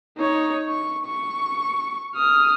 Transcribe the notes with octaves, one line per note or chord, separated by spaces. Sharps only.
D#4 C#5
C#6
C#6
D#6 F6